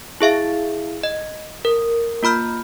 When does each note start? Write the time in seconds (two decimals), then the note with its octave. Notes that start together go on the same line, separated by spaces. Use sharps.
0.21 E4 G#4 E5 F5
1.03 D#5
1.65 A#4
2.23 A#3 F4 B5 F6 G6